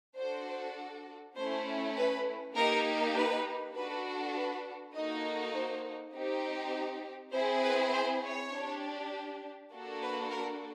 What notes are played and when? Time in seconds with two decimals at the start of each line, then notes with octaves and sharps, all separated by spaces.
0.17 D4 F#4 A4 C5
1.36 A3 C#4 E4 C5
1.96 B4
2.55 A#3 D#4 G4 A#4
3.16 B4
3.75 D4 F#4 A4 B4
4.35 B4
4.94 A#3 D#4 F#4 A4 D#5
5.54 C5
6.14 C4 D#4 G4
7.33 C4 E4 G#4 C5
7.64 B4
7.93 C5
8.23 C#5
8.52 D4 G4
9.72 A#3 D4 F#4 A4
10.02 B4
10.31 A#4